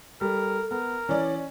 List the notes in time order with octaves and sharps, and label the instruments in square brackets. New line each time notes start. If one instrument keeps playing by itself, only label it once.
[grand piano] G3 [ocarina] A4 [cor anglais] A#4
[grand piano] B3 [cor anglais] A#4
[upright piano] E3 D5 [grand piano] C#4 [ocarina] C#5